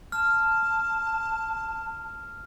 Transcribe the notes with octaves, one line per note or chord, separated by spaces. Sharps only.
A5 F6